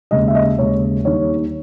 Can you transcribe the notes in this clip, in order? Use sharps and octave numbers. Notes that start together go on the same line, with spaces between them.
D#2 C#3 G#3 D#5
E5
D#5
D#2 C#3 G#3 C#5
D#2 D#3 G3 C#5